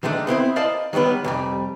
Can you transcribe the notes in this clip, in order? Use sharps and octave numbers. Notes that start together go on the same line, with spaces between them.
D#3 G#3 A3 B3 D4
B3 C4 E4 C5
A#4 C5 D5 D#5 F5 A5
D#3 F#3 G3 B3 B4
C2 F2 G3